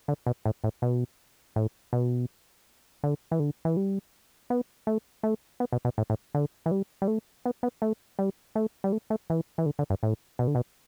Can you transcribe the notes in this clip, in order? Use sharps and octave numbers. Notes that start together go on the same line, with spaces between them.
D3
B2
A2
A2
B2
A2
B2
D3
E3
D3
E3
G3
B3
A3
A3
B3
B2
B2
A2
A2
D3
E3
G3
G3
A3
B3
B3
A3
G3
A3
G3
A3
A3
E3
E3
D3
D3
G2
A2
B2
D3
B2